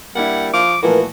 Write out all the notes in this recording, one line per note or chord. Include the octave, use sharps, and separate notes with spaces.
G3 A#3 D4 E4 F#5
F3 D6
A#2 E3 F3 A3 F#4 A#4 B4